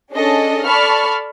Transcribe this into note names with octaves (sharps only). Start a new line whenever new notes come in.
C#4 D4 G#4 A4 D#5
A4 D5 A5 B5 C#6 F6